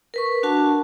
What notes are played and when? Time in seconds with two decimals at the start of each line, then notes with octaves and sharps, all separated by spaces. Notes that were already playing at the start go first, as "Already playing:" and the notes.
0.14 A#4 B4 C#6
0.43 D4 F#4 F#5 A5